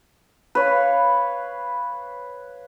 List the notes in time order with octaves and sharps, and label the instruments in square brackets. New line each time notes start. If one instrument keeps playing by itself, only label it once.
[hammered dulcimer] B4 C#5 F5